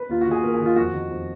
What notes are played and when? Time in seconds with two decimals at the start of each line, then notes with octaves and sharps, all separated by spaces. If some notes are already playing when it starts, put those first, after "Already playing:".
Already playing: B4
0.09 D#2 F4
0.21 D#3 F#4
0.31 G#4
0.43 D#2 A#4
0.54 D#3 G#4
0.66 F4
0.76 F2 F#4
0.93 D#3
1.10 F2